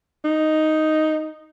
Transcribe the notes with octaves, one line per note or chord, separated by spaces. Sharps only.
D#4